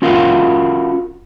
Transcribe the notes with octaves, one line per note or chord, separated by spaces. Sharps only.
C#4 F4 F#4 A#4 F5